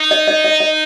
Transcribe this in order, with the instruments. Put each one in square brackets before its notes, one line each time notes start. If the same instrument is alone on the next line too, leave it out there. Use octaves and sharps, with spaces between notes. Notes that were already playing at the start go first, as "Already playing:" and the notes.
Already playing: [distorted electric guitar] D#4
[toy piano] D#5
D#5
D#5
D#5